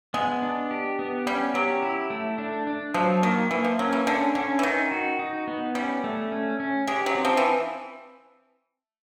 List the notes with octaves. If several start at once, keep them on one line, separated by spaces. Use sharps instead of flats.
G#3 B3
D4
G4
B3
G3 C#4
F#3 G4
E4
A3
D4
D4
F3 F#3
D#3 A#3
E3 A#3
F3
F#3 C#4
E3
D3 C#4
D3 C#4
E3
D#3 D#4
F#4
D#4
B3
G3 C#4
A3
C#4
C#4
G#3 G4
F#3
C4
F3
E3